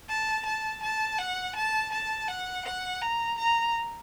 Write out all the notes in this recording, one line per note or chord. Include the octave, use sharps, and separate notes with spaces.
A5
A5
A5
F#5
A5
A5
F#5
F#5
A#5
A#5